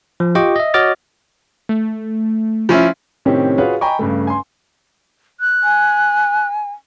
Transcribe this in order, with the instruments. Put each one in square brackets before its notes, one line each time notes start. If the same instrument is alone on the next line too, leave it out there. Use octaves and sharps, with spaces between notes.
[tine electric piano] F3
F4 G4 D#5 G5 C#6 D6
D#5 E5
F#4 C#5 D#5 D6 F6 A6
[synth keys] A3
[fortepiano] F3 C#4 E4
[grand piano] A2 C3 D#3 C4 C#4 G4
F4 F#4 G#4 B4 C#5 F5
D#5 G5 G#5 A#5 B5 C#6
G2 C#3 A3
G#5 C6
[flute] F#6
[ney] G#5